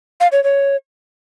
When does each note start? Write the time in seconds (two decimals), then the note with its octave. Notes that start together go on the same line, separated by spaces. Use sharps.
0.20 F5
0.32 C#5
0.44 C#5